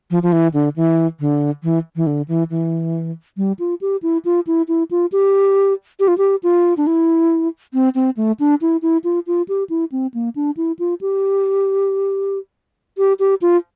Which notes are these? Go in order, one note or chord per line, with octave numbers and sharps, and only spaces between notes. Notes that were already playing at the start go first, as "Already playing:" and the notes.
F3
F3
E3
D3
E3
D3
E3
E3
D3
E3
E3
G3
F4
G4
E4
F4
E4
E4
F4
G4
G4
F4
G4
F4
D4
E4
C4
C4
A3
D4
E4
E4
F4
F4
G4
E4
C4
A#3
D4
E4
F4
G4
G4
G4
F4